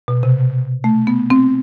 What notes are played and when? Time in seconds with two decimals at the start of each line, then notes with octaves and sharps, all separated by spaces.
0.08 B2
0.23 C3
0.84 A3
1.07 B3
1.30 C4